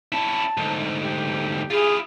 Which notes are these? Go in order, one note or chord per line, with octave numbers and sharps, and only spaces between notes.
C#4 E4 A5
D2 G#2
G4
E4 F4 G#4